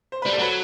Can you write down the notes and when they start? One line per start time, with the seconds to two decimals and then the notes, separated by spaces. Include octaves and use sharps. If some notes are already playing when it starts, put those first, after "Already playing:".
0.12 C5
0.22 G3 B4
0.33 A4
0.38 F#3 B4